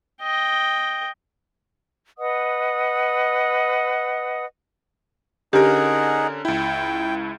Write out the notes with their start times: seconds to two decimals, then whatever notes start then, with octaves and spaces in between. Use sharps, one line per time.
0.22 D#5 G5
2.19 B4 D#5 F#5 D#6
5.53 D3 C#4 D#4 G4 G#4 A#4 F#5
6.45 C#2 E4 G5